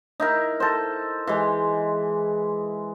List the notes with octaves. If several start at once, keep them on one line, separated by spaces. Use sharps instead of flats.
D#4 E4 A#4
A4 C5
E3 G#3